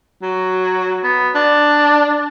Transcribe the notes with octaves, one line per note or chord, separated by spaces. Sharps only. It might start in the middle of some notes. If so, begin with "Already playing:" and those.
F#3
B3
D4